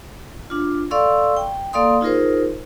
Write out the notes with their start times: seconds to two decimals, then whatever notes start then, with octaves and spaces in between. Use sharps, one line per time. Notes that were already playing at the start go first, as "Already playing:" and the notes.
0.50 D4 F4
0.91 A4 D5 F5 C6 C#6 E6
1.37 G5
1.73 A#3 A4 D5 F5 C6 D#6
2.01 D#4 F4 G#4 A#4 C5